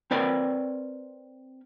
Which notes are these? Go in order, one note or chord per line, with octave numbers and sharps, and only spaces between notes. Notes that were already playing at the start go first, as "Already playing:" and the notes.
C4 A#4 B4 D5 B5